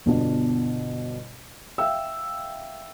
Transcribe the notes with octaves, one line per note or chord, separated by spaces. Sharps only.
G1 B2 D4
E5 F5 G5 E6